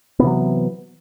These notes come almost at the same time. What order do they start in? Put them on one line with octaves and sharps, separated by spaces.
B3 C3 E3 F#3